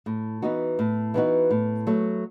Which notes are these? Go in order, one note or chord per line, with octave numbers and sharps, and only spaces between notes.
A2
E3 B3 D#4 F#4
A2
E3 B3 D#4 F#4
A2
F#3 A3